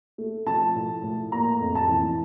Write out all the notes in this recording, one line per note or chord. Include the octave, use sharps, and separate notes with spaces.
A3
F3 A5
A2
A2
A#3 A#5
F2
A5
E3